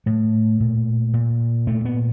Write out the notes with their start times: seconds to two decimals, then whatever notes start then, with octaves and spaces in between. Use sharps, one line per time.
0.06 A2 A3
0.60 A#2
1.14 A#2
1.67 A#2 A3
1.85 B3